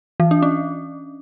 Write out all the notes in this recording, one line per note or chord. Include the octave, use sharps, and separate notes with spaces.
E3
D4
C#4